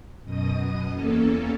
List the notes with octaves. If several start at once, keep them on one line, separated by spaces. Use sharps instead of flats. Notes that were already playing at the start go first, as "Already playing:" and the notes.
F#2 B2 D#5 D#6
E2 A#3 C#4 A4